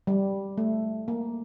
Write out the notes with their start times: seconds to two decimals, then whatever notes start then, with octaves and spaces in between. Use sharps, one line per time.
0.07 G3
0.58 A3
1.08 A#3